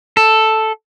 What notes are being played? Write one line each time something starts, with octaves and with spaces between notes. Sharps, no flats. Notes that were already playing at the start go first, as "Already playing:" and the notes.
A4